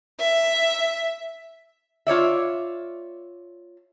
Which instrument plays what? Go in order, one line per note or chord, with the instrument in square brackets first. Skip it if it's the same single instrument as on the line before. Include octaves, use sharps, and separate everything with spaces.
[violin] E5
[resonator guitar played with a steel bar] F4 C#5 D5 E5